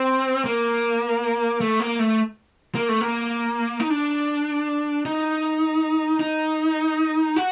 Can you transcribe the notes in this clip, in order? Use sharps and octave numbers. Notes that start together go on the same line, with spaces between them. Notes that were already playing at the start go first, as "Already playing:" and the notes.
Already playing: C4
A#3
A3
A#3
A3
A#3
A3
A#3
D#4
D4
D#4
D#4
F#4